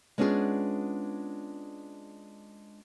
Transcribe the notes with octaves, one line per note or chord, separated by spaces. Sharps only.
G#3 B3 C#4 D4 F4 G#4